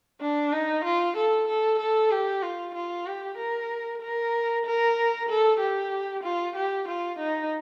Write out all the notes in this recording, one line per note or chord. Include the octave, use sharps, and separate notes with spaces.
D4
D#4
F4
A4
A4
A4
G4
F4
F4
G4
A#4
A#4
A#4
A4
G4
F4
G4
F4
D#4